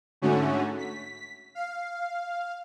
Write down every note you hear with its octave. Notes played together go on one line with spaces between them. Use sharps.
G#2 D3 A3 C#4 F#4
B6
F5